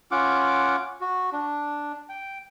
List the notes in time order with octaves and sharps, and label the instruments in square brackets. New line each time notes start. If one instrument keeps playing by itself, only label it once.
[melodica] C#4 F4 F#5 D6
F#4
D4
G5